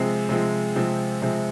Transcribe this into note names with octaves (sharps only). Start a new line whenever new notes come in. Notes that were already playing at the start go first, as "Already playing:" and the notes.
Already playing: C3 F3 G#3 C4
C3 F3 G#3 C4
C3 F3 G#3 C4
C3 F3 G#3 C4